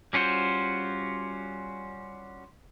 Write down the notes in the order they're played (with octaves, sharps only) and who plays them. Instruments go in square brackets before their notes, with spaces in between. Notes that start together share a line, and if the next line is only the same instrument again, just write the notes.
[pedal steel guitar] G3 C#4 F4 F#4 C5